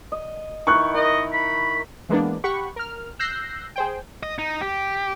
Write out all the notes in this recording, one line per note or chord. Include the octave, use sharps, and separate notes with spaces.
D#5
D#3 E4 A#4 C#6 F#6
A#4 D#5
B5
E3 G#3 A#3 B3 D4
G4 F#5 B5 C#6
A#4 F6
E6 F#6 G6 A#6 C7
G#4 C5 G5
D#5
D#4
G4